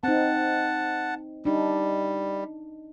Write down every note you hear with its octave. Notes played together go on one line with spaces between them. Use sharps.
C4 D#4 F#5 A5
G3 D4 D#4